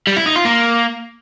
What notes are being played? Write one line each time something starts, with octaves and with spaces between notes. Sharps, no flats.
G3
E4
D#4
F4
A#3